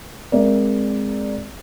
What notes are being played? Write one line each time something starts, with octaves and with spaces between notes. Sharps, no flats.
G#3 C4 A#4 D5 E5